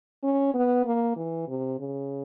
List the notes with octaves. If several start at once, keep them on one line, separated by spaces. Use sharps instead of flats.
C#4
B3
A#3
E3
C3
C#3